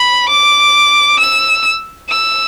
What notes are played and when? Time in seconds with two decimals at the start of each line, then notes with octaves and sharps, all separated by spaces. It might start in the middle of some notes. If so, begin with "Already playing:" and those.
Already playing: B5
0.29 D6
1.19 E6
2.10 E6